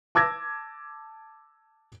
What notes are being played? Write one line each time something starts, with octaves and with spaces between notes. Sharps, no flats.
A5 D6 E6 G#6 A#6